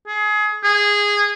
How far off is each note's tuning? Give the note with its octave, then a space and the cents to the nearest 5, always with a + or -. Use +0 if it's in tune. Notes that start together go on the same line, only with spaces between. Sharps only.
G#4 +25
G#4 -15